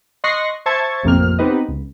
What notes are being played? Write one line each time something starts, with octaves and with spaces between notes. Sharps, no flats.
D#5 C6 C#6 F#6 A#6 C7
C5 E5 A5 C#6 G#6
A1 F2 C3 A#3 C4 F6
B3 C4 D#4 G4 B4 D#5
C#2